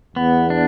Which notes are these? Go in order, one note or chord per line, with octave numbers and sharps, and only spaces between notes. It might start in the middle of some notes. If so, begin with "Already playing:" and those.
E2 B3
D4